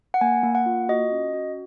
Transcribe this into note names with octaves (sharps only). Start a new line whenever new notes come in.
F#5
A#3 G#5
A#3
F#5
F4
F#4 D#5
C#4
F#4